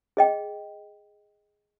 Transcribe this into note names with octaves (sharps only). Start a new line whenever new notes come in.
G#4 D#5 G5